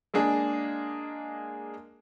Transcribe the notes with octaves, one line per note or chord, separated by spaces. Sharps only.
G#3 A#3 D4 G#4